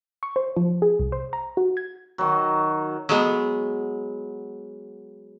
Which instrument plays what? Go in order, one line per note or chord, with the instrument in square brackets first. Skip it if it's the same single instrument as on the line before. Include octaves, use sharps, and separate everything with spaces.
[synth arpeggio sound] C#6
C5
F3
G#4
C2
C5
A#5
F#4
G#6
[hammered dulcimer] D#3 F#3
[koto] F#3 G#3 B3